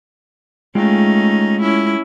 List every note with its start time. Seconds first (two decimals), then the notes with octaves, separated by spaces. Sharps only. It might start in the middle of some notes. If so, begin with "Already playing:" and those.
0.75 G#3 A3 C#4 D#4 F4 G5
1.61 C#4 E4